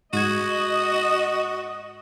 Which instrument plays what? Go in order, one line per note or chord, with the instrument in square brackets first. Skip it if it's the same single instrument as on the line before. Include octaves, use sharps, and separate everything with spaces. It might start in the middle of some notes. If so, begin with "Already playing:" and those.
[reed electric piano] G#2 G#6 [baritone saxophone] F#4 [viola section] D#5